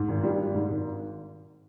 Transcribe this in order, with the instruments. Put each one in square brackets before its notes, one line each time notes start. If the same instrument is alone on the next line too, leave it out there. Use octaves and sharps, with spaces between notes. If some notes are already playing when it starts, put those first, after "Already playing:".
Already playing: [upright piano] G#2
G#1
G3
D4
G#2
G#1